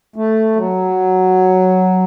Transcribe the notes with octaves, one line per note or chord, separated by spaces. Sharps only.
A3
F#3